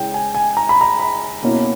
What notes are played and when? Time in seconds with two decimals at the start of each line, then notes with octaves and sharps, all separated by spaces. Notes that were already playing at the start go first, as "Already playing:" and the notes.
Already playing: C#3 G#3 C#4 E4 G5
0.14 G#5
0.35 G#5
0.57 A#5
0.69 B5
0.81 A#5
0.99 B5
1.42 B2 A#3 C#4 E4